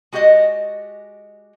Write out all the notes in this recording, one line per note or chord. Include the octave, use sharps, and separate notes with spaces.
G#3 F#4 G4 D5 D#5 G#5